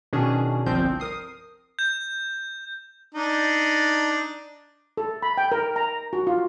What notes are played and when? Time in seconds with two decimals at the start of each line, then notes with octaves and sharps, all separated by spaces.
0.13 B2 D#3 C#4 D4 G#4
0.66 G1 C2 F3 C4 G6
1.00 A#4 D#6 C7
1.79 G6
3.15 D4 D#4
4.97 A4
5.23 B5
5.38 G5
5.52 A#4
5.76 A#5
6.13 F#4
6.27 F4